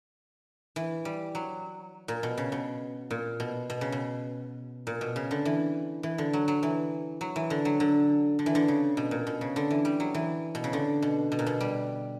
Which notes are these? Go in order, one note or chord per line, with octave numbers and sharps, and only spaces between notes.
E3
G3
F#3
A#2
B2
C#3
B2
A#2
B2
B2
C#3
B2
A#2
B2
C#3
D3
E3
E3
D3
F#3
F#3
E3
F#3
E3
D3
F#3
D3
D3
E3
D3
C#3
B2
A#2
B2
C#3
D3
E3
G3
F#3
E3
B2
C#3
D3
B2
B2
A#2
B2
G3